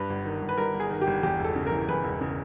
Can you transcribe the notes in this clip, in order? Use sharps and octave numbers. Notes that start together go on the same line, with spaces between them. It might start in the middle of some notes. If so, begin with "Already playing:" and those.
Already playing: G2 B4
G1
D#3
G1
B4
G2 A#4
G1
G#4
D#3
G4
G1
E2 G4
E1 A4
C#3
A#4
E3
E2 B4
E1
C#3